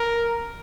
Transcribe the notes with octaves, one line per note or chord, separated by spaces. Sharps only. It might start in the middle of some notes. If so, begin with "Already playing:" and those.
Already playing: A#4